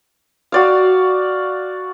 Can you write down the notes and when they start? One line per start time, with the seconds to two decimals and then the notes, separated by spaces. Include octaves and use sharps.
0.52 F#4 D5 F5